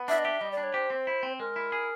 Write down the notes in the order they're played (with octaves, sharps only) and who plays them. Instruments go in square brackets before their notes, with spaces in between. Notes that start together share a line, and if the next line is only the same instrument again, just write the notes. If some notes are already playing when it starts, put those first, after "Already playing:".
Already playing: [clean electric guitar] B3
[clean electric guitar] D4 [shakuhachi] E5
[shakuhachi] D#5
[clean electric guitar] G4 [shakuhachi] E5
[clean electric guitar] G3 [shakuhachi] D#5
[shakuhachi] D5
[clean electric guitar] D4
[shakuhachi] C#5
[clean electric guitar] G4 [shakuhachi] C5
[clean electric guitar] C4
E4
C4
[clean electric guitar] G#3 [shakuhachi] A#4
[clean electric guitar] E4
G#4